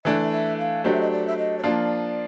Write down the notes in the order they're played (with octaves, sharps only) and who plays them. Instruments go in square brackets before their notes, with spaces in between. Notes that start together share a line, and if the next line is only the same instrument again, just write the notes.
[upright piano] E3 A3 D4 [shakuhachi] E5
[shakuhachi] E5
F5
[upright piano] F#3 A3 D4 G4 C5 [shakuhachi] D#5
[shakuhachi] E5
D#5
D5
E5
D#5
C#5
[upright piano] F3 A#3 D4 F4 [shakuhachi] D5